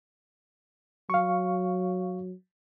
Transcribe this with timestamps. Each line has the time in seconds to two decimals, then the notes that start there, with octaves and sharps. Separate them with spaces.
1.10 F#3 F5 C#6